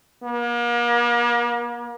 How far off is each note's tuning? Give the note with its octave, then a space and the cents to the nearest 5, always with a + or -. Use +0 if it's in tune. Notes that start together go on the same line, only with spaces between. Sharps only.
A#3 +40